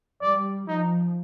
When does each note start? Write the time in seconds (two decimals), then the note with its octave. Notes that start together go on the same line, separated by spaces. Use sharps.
0.22 G3 D5
0.68 F3 D#4